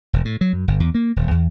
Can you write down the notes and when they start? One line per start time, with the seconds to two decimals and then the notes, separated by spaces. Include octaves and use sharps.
0.13 E1
0.25 A2
0.41 F#3
0.53 F#2
0.68 G1
0.80 E2
0.95 A#3
1.16 D#1
1.31 E2